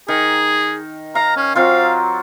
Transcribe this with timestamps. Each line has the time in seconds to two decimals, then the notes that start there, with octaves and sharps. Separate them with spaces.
0.08 D#3 G#4
1.15 F5 A#5
1.36 C#4
1.55 F#3 C4 F4 F5